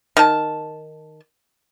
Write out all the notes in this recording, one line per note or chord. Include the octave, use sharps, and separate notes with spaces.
D#3 A5